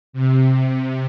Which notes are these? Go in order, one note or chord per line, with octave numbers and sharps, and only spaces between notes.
C3